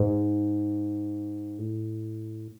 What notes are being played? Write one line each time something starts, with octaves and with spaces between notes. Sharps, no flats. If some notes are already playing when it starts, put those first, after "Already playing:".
Already playing: G#2
A2